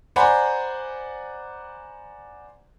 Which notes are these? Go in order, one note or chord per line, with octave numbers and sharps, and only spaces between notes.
C5 D5 F#5 G#5 A#5 B5